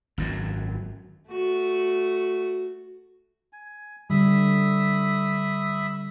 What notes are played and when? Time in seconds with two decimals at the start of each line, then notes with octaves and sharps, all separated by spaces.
0.18 G#1 F#2 A#2 F#3
1.31 A3 F#4
3.53 G#5
4.10 D3 G3 E5 B5 D#6